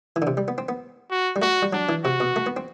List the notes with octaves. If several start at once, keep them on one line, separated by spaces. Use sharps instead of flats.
E3
D3
C3
G3
B3
C4
B3
F#4
G3
A3 F#4
G3
F#3 D4
E3
C3 F#4
B2
A3
B3
C4